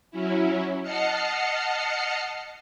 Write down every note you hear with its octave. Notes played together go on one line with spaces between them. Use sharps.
F#3 C#4 E4
D#5 F#5 A5 F6 C7 C#7